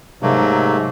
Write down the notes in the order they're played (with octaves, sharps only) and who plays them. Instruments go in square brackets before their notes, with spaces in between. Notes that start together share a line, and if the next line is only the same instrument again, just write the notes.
[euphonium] G#2 [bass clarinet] C3 [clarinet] F#3 [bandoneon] A3 A#3